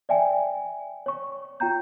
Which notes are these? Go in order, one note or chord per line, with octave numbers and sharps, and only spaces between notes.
D5 E5 G5 G#5
C#5 C#6
F4 G5 A#5 G6